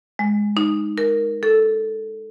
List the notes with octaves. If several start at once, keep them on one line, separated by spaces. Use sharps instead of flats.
G#3
D#4
A#4
A4